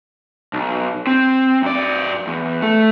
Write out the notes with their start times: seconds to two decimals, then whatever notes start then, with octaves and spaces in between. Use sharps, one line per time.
0.53 B1
1.07 C4
1.63 F#2 D5
2.27 E2
2.62 A3